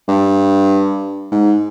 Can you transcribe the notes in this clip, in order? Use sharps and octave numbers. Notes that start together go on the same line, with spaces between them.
G2
G#2